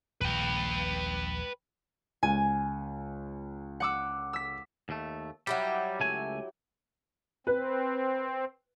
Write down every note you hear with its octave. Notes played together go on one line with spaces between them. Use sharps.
D#1 A#1 B4 G5
C#2 G#5
F#5 D6 E6
E6 B6
D#2 A3
F#3 G3 E4 G4
C#2 A3 G#5
C4 B4